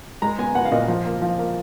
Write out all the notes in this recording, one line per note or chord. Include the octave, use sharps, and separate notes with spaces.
G#3 A#5
B3 G#5
B3 F#5
F5
A#2 D#5
F3
A#3
F3
A#3